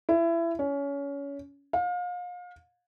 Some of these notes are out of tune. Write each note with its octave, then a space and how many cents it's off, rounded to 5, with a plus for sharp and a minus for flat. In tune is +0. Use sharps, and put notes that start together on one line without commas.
E4 +25
C#4 +25
F5 +35